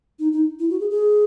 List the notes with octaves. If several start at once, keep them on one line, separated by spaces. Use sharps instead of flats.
D#4
D#4
E4
F#4
G#4
G#4